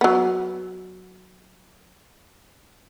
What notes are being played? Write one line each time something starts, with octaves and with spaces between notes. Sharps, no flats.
F#3 B3